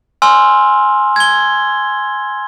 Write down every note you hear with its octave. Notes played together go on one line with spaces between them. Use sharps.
G#5 C6 E6 F6
G#6 G7